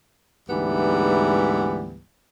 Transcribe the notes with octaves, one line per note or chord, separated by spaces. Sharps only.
D2 G#2 E3 G3 B3